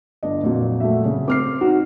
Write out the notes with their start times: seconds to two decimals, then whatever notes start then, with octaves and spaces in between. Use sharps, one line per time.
0.23 G1 D4 D#5
0.43 F2 A#2 F#3
0.80 A3 F#4 E5
1.05 C#3
1.28 C4 D6 F6 C7
1.61 D#4 F#4